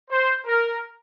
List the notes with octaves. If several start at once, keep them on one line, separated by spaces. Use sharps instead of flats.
C5
A#4